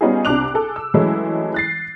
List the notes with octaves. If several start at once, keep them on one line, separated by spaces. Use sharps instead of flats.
G3 B3 C#4 D#4 F4 G#4
C2 C3 D4 D6 F#6 F7
G#4 A4
E6
E3 F#3 G#3 A3 C#4 E4
F#6 A6 C7